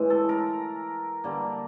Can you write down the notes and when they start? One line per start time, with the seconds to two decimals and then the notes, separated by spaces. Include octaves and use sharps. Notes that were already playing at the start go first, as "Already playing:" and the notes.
Already playing: A2 E3 G#3
0.10 A4
0.29 A#4
1.24 D3 G3 A#3